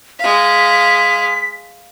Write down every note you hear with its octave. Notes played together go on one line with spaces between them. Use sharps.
G#3 F5 B6